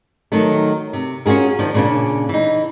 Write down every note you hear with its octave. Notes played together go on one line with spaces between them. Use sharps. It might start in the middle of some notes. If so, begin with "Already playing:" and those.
D#3 F#3 A3
C3
C#4 F4 F#4 G#4 A#4
D#3 F3 D4
A#2 C#3 D4
E3 D#4